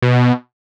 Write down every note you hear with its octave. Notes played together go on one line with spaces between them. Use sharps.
B2